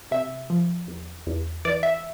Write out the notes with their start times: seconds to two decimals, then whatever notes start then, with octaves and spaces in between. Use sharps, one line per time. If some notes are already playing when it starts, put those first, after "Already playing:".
0.11 C3 E5
0.50 F3
0.88 E2
1.27 E2
1.65 E3 D5
1.83 E5